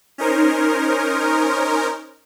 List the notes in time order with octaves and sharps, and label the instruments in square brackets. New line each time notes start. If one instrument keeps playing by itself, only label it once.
[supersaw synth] C#4 D#4 A#4 C5